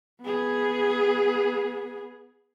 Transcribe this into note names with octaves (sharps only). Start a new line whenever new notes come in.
B3 G#4